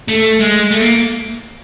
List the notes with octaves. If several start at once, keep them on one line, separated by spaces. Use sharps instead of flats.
A3
G#3
A3
A#3